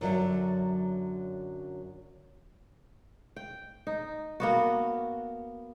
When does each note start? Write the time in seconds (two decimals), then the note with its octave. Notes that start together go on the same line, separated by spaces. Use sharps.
0.01 F#2 D3 F#3 D5 E5
3.36 G5
3.87 D#4
4.40 A#3 B3 F#4